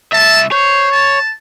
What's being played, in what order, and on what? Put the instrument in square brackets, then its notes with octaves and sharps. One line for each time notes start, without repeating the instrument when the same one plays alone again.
[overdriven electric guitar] C2 E5 [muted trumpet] A5
[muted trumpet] C5 [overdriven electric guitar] C#5
[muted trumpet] A5